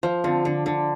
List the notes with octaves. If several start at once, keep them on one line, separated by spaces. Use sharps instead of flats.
F3 C5 F5
D3 C4 F4
D3 D4
D3 D4